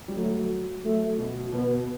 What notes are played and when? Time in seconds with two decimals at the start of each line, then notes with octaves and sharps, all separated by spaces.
0.08 G3
0.16 F#3 A3
0.85 F#3 A3
1.18 B2
1.52 B2 B3